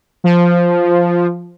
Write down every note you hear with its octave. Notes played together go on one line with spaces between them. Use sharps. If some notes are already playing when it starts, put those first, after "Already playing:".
F3